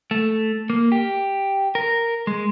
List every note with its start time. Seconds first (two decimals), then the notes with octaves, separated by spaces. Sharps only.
0.11 A3
0.70 A#3
0.92 G4
1.75 A#4
2.27 G#3